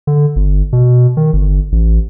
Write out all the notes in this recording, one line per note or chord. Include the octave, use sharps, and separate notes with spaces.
D3
G1
B2
D#3
G1
A1